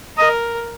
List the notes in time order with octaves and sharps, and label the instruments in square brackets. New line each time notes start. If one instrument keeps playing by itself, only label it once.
[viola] A#4 [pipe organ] D#5